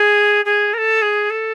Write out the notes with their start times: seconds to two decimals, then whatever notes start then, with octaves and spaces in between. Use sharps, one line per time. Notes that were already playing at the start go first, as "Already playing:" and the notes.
Already playing: G#4
0.45 G#4
0.74 A#4
0.78 A4
1.02 G#4
1.30 A4